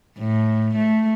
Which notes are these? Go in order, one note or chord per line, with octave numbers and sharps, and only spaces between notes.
A2
A3